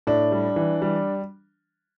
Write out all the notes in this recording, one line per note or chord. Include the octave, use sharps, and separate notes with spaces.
A2 D4
G3
E3
G3